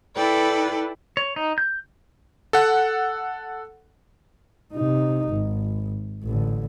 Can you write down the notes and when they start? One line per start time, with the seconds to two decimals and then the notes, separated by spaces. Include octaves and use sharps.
0.16 E4 A4 B4 D5 G5
1.17 C#5
1.36 D#4
1.58 G6
2.53 A4 F#5
4.73 C3 D#4
5.29 G#1
6.24 A1 D3